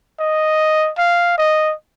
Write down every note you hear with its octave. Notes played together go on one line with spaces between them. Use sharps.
D#5
F5
D#5